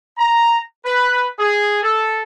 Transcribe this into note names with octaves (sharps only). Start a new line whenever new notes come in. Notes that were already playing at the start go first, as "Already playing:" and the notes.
A#5
B4
G#4
A4